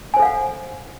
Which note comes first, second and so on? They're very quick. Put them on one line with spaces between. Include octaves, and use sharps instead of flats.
G#5 C5 A4 F5 F#5